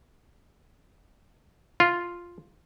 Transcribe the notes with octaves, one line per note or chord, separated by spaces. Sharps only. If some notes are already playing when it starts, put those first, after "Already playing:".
F4